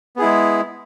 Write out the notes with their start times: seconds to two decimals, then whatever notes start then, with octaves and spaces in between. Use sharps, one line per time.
0.16 B3
0.19 G#4
0.21 E4
0.24 G#3